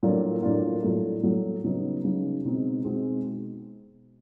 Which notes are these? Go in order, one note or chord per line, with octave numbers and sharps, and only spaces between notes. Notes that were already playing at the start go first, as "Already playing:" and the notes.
A2 F#3 A#3 D4 F4
A2 F#3 A#3 D4 F4
A2 F#3 A3
A2 F#3 A3
C#3 F#3 B3 D#4
C#3 F#3 B3 D#4
B2 G#3 C4 D#4 F#4
B2 G#3 C4 D#4 F#4